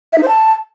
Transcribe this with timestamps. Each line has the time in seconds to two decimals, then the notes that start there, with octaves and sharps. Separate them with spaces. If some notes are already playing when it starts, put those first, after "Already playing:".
0.13 E5
0.18 D#4
0.23 C5
0.28 A5